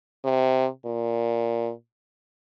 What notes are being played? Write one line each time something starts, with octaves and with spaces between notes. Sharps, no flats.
C3
A#2